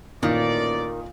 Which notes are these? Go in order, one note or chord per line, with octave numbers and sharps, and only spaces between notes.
A1 A#2 D#3 A#3 D5